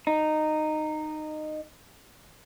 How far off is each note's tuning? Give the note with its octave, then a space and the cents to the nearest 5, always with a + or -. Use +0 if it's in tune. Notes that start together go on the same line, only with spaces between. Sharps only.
D#4 -15